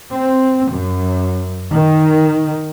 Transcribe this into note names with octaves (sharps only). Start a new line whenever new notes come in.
C4
F#2
D#3